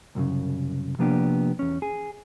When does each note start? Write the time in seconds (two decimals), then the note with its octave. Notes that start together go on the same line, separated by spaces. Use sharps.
0.15 C2 F#2 A2 C#3
0.99 C3 F3 A#3 B3 D4 G4
1.59 E2 C#4
1.82 G#4